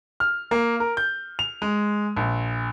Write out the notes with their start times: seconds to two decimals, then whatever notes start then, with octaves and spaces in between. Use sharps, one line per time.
0.20 F6
0.51 A#3
0.80 A#4
0.97 G6
1.39 F7
1.62 G#3
2.17 A#1